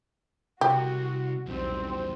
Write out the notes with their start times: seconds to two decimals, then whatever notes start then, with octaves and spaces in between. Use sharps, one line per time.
0.61 C2 F#4 G4
1.47 B1 E2 G3 C4